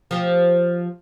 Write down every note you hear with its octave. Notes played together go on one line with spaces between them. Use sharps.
F3 G4